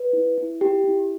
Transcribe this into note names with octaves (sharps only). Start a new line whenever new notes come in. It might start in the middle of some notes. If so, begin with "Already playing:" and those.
Already playing: B4
E4
E4
G4
E4